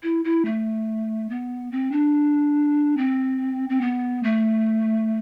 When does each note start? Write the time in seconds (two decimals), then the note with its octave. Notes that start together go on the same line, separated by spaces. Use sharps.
0.03 E4
0.25 E4
0.45 A3
1.29 B3
1.72 C4
1.92 D4
2.97 C4
3.69 C4
3.81 B3
4.23 A3